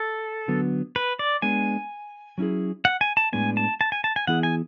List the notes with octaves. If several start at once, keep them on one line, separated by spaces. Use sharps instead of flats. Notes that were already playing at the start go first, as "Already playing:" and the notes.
Already playing: A4
D3 F#3 B3
B4
D5
G#3 B3 D4 G#5
F#3 C#4 E4 G#4
F#5
G#5
A5
A2 G#3 B3 D4 G#5
A5
A5
G#5
A5
G#5
E3 B3 E4 G#4 F#5
G#5